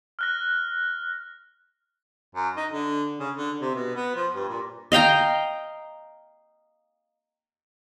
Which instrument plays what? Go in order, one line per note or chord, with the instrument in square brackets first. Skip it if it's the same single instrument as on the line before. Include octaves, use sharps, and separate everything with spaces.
[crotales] F6 F#6 A#6
[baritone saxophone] F#2
D#4
D3
C#3
D3
C3
B2
B3
F3
G2
A#2
[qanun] D#5 F5 G5 A#5